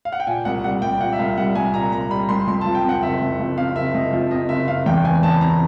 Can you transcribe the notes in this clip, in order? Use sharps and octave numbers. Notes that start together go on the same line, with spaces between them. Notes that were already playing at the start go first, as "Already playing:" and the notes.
F5
F#5
G5
A#2 G#5
C2 F#5
G3 F#5
C2 G5
A#2 F#5
E5
C2 F5
G3 F#5
C2 G#5
A#2 A#5
C2 A#5
G3 B5
B5
C2 C6
F2 C6
A5
F3
G5
C3 F#5
F#1 E5
F2
F3
C3 F5
F#1 E5
F2 D#5
F3
C3 D#5
F#1 E5
C3 F5
E2 G5
E3 G#5
E2 A5
B5
C3 A#5